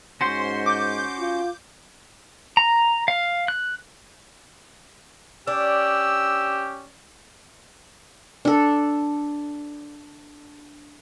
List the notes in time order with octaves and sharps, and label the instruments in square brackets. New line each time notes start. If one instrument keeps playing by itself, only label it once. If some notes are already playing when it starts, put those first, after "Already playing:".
[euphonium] G#2 [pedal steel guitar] C#4 F#4 C5 [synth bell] C6
[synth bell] D6 G6
[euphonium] F4
[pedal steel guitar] A#5
F5
F#6
[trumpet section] C#4 G4 [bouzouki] D4 [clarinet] E6
[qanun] D4 A4